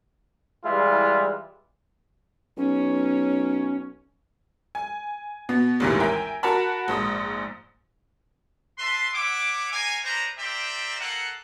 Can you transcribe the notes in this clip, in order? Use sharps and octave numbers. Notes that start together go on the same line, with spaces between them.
E3 G3 G#3 E4 F4
B1 C#4
G#5
B2 B3
A1 D#2 G#2 C3 D#3 E3
A#4 E5 G5 G#5
F#4 A#4 F#5 A5 B5
A#1 G#2 D#6
B4 E5 A5 C6
C#5 E5 F#5 D6
A#4 C#5 D#5 F5 G#5
G3 G#3 D4 B4 C5 A#5
C4 G4 A#4 D5 E5 G5
A#3 F4 A4 A#4 F#5